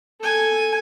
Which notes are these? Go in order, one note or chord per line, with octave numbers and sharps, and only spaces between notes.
A4 G#5